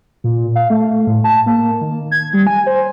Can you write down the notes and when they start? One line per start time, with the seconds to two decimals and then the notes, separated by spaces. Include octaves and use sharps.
0.24 A#2
0.56 F5
0.70 A3
1.07 A2
1.24 A5
1.46 A#3
1.81 D#3
2.11 G#6
2.33 G3
2.47 G#5
2.66 C5